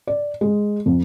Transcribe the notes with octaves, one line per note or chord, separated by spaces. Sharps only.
D5
G#3
F2